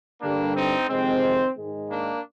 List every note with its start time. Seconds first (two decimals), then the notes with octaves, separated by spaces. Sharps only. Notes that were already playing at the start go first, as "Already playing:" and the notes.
0.21 G2 D3 G3 A#3 D4
0.55 C4 D#4
0.89 F2 C3 D#3 G#3 C4
1.56 G#2 D#3 G#3
1.89 A#3 D4